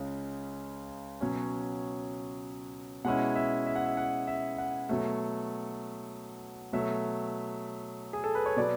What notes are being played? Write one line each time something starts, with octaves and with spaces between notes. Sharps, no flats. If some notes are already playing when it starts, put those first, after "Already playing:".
Already playing: C#2 C#3 G#3
B2 F#3 C#4
B2 G#3 C#4 E4 F#5
E5
E5
F#5
E5
F#5
E5
F#5
B2 F#3 A3
B2 F#3 A3 E5
G#4
A4
B4
C#5
B2 F#3 B3 D5